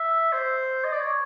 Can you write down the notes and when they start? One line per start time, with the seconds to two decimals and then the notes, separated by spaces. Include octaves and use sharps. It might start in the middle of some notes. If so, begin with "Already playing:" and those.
Already playing: E5
0.32 C5
0.84 D#5
0.92 D5
1.01 C#5